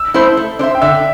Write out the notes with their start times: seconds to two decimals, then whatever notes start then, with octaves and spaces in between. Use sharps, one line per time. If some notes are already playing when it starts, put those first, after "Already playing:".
Already playing: E6
0.14 A3 E4 C5
0.37 A3
0.59 D4 C5 E5
0.75 G5
0.81 D3 E5